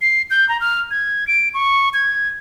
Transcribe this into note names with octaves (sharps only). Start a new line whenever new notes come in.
C7
G6
A#5
F6
G#6
D7
C#6
G#6